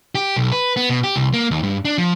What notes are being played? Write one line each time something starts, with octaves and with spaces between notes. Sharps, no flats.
G4
B1
B4
B3
B2
G4
C2
A#3
D#2
G2
D4
F3